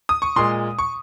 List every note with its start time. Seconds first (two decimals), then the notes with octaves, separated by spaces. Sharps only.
0.09 D#6
0.22 C#6
0.36 A#2 G#3 C6
0.79 C#6